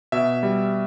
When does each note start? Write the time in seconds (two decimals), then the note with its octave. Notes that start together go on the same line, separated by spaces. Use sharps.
0.12 B2 E5
0.43 G3